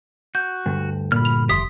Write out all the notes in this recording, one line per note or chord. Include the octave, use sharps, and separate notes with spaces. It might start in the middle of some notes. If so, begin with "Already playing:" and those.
F#4 G6
D2 G2
A#2 B5 F6
F7
F1 G4 E5 C6 D#6 B6